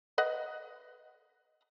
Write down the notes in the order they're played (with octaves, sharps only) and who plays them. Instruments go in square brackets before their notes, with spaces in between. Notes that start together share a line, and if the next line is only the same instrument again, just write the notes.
[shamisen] B4 D#5 F#5